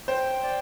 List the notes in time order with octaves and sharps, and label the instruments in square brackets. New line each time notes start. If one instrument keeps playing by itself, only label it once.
[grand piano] C5 [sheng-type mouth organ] G5
[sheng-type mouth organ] D5